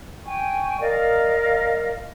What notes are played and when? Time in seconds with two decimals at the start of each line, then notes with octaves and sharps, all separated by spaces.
0.24 G5 G#5 C#6
0.80 A#4 D5 D#5 F5